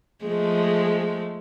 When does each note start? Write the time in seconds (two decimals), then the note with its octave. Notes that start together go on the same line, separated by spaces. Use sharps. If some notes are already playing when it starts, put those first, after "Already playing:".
0.25 F3 G#3 A3